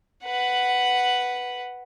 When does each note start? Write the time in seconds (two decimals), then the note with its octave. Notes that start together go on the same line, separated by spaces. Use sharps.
0.25 B4 F#5